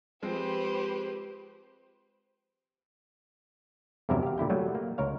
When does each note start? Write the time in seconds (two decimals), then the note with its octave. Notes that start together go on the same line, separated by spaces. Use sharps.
0.22 F3 G#3 C4 G4 B4 C5
4.09 E2 G2 C3 F#3 A#4 E5
4.23 G4 F5
4.38 A#2 D3 E4 G5
4.50 F#3 G3 A3
4.75 A#3
4.98 C#2 A#4 C#5 F5